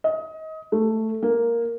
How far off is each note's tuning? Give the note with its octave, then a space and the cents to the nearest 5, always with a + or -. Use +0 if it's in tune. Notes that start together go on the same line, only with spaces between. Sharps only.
D#5 +25
A3 +5
A#3 +0